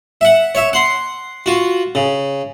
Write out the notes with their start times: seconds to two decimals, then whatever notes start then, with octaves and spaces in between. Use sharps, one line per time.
0.21 E5 F#5
0.55 C#5 E5
0.73 F#5 C6
1.46 F4 F#4
1.95 C#3